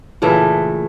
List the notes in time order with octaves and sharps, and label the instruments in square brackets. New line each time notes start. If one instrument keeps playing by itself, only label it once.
[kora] A#2 C#3 E3 A3